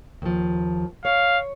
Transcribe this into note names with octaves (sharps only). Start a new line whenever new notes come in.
D#2 F3
C#5 F5